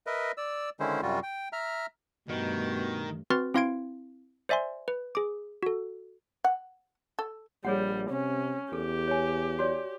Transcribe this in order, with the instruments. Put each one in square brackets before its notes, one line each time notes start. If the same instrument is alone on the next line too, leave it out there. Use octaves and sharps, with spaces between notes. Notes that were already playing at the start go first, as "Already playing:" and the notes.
[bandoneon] A#4 B4 D#5 E5
D5 E6
D3 D#3 G#3 C#4 E4 C5
F#2 C3 G3 F4 F#4
G5
E5 A#5 F6
[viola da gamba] G2 A3 [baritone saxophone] B2 [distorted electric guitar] D#3
[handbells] C4 F#4 B4 C6 F6 A6
C4 E4 F5 C6 G#6 D7
C5 D5 E5 G#5 C6
B4
G#4 D6
F#4 A4
[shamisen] F#5
A4
[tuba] A#1 [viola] G3 [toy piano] G#4 C#5 F#5
[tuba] C3 [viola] C#4
[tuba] E2 [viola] G4 [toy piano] A4
[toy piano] C#5 G#5
F#4 C#5 D5